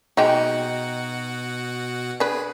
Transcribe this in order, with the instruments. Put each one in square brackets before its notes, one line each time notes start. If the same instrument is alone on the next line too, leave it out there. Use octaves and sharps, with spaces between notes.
[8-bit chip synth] B2 F#4 F#5 [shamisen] F#3 G#3 G4 [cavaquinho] D#4
[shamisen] D4 B4 [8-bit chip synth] G#4